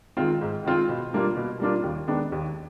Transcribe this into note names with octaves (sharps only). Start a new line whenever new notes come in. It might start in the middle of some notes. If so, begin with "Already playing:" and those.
D#3 G#3 C4 F4
G#2
D#3 G#3 C4 F4
B2
G3 A#3 D4 F4
B2
G3 A#3 D4 F4
D#2
D#3 G#3 B3 D4
D#2